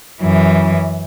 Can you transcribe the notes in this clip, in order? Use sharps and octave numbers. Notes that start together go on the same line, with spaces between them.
F#2 E3